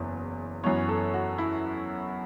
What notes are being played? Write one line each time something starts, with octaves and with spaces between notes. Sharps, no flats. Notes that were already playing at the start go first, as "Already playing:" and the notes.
Already playing: F#1 E2 F#3
F#2 E3 B3 C#5
A4
F#4
E4